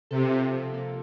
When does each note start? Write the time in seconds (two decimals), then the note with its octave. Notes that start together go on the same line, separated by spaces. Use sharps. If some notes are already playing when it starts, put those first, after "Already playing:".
0.11 C3 A4
0.31 F4
0.52 F3
0.73 A#3